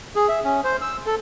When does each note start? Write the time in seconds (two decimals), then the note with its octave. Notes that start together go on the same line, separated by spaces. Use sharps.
0.16 G#4
0.29 E5
0.44 C#4
0.64 C5
0.81 E6
1.06 A4